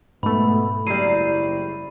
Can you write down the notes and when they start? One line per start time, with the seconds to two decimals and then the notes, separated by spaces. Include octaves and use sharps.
0.23 G#2 B2 A3 B3 B5
0.87 F#1 G#2 F#3 G3 E4 C7 D#7